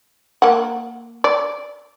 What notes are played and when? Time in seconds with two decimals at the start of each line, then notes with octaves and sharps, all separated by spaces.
0.42 A#3 F#5
1.24 D5